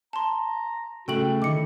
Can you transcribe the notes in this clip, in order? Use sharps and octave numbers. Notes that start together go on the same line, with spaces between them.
A5 A#5 C6
C#3 A3 F#4 A4 G5 F#7
D3 D#3 E4 D#5 D6 C#7